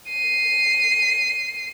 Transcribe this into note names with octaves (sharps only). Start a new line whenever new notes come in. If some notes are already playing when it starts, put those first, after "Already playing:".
C7 D#7